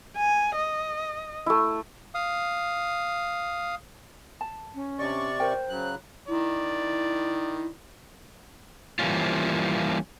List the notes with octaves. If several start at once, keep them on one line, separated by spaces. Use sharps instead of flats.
G#5
D#5
A3 E4
F5 D#6
A5
C#4
C3 D4 D5 D#5 C#6
A#4 C5 G5
C#3 F#3 F#6
D#3 E4 D5
E3 F3 G3 A#3 C#4 F4